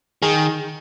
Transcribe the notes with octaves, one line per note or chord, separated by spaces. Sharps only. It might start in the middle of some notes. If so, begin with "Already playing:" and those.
D#3 G#4